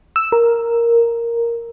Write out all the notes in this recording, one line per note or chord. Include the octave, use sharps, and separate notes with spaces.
E6
A#4